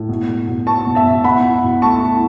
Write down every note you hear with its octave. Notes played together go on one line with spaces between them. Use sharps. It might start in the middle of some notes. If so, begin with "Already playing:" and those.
Already playing: A2
B2
B2
B2
B2 A5 C#6
B2
E5 A5
B2
B2 F#5 B5
E4
B2
A3 A5 C#6
E4